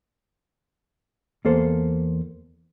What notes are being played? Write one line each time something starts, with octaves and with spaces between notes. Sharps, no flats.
E2 A#3 A4 C5